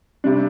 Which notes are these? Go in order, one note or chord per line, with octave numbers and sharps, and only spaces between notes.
C3 G3 D4